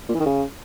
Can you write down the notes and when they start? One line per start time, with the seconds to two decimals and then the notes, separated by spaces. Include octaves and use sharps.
0.09 A#2
0.14 E3
0.20 D#3
0.26 C#3